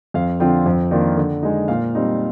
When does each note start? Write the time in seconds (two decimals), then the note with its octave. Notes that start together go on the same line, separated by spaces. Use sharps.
0.14 F2 F5
0.40 D3 F3 C4 F4 G5
0.66 F2
0.91 D#3 A#3 D4 F4
1.17 D3
1.43 G#3 D#4
1.68 A#2 F5
1.95 G3 C4 D#4